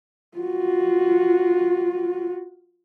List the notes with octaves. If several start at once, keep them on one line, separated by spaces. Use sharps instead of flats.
F4 F#4